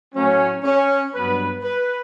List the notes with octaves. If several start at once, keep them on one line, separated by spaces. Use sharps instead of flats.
A2 F#3 A3 C#4
C#4
G2 F#3 B3 B4
B4